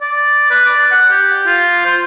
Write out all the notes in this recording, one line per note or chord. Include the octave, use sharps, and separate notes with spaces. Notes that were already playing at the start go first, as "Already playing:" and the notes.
D5
B4
D5
F#5
G4
F4
C5